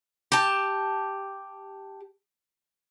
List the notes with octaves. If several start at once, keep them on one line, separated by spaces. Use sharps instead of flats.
G4 A5